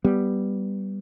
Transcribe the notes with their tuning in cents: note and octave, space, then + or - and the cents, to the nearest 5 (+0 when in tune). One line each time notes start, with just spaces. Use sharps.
G3 +0 B3 +0